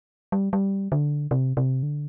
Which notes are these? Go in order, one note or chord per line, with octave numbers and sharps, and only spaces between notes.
G3
G3
D3
C3
C3
D3